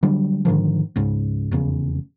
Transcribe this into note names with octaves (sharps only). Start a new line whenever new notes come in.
D3 F#3 G3
G#2 D3 D#3 F3
C#2 G#2 C#3
F1 E2 C#3